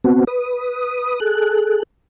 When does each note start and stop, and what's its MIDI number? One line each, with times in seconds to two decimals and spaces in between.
0.04 0.24 59
0.04 0.24 60
0.04 0.24 66
0.27 1.20 71
0.27 1.20 87
1.20 1.83 68
1.20 1.83 69
1.20 1.83 90